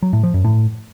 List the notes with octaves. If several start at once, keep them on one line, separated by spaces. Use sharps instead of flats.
F#3
A2
F3
F#2
A2